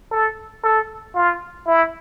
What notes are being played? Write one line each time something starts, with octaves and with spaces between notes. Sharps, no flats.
A4
A4
F4
E4